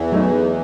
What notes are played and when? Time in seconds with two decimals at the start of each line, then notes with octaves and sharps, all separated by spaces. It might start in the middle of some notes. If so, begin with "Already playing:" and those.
Already playing: E2 E3
0.12 F#3 A3 D#4